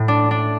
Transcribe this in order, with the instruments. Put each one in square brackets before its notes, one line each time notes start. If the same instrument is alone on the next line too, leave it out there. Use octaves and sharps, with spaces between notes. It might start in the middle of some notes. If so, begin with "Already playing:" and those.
Already playing: [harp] A2
D4
D4